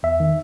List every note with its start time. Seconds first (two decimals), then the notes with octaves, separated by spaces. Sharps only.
0.03 E2 E5
0.20 D#3